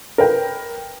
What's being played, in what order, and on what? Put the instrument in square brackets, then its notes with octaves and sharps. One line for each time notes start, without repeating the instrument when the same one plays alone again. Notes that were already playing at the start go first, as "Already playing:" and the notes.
[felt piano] A#4 B4 G5